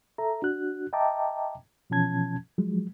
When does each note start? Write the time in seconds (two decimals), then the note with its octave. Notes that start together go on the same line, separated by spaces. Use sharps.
0.18 A4 E5 A#5
0.42 D4 F#4 F#6
0.93 D#5 E5 G5 A5 A#5 D6
1.90 B2 E3 F3 C#4 A5 G#6
2.58 F3 F#3 G#3